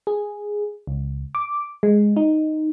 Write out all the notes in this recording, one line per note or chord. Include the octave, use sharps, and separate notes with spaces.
G#4
C#2
D6
G#3
D#4